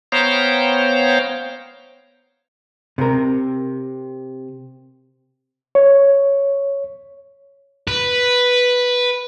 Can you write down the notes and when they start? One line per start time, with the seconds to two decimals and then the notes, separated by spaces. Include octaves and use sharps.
0.12 B3 C5 C#5 F5 G5 A#5
2.98 C3 A#4
5.75 C#5
7.88 B4